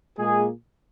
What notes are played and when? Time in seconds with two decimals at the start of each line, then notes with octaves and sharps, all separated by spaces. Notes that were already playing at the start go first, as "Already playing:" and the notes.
0.17 A#2 G#3 A#3 G#4